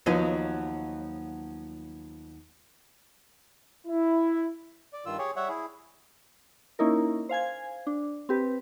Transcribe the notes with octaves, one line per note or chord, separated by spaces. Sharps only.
D#2 F3 F#3 B3 D#5
E4
D5
G2 D#3 F4 E6
G4 G#4 C#5
G3 C#5 E5 F#5
E4 G#4
A#3 C#4 D#4 E4 A#4
C5 F5 G#5 G#6
D4
C4 G4 B4